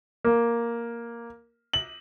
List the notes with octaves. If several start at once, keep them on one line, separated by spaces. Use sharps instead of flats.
A#3
F#7